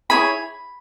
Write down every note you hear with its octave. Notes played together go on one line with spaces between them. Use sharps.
E4 G#4 C#5 B5